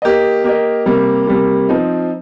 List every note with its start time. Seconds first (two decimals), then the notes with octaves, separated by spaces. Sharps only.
0.02 A#3 G4 A#4 D#5
0.44 A#3 G4 A#4 D#5
0.86 C3 G3 A#3
1.27 C3 G3 A#3
1.69 F3 C4 D#4